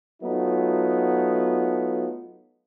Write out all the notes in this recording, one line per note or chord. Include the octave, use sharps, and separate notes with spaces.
F#3 A3 B3 D#4 F4